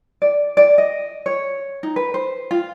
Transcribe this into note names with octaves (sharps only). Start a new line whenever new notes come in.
D5
D5
D#5
C#5
D#4
B4
C5
F4